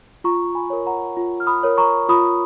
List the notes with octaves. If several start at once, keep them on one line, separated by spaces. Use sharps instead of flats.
F4 A#5 C#6
G#5 B5
A#4 C#5
F#5 A#5
F4
F6
B5 D#6
A#4 C#5
A#5 C#6
F4 B5 D#6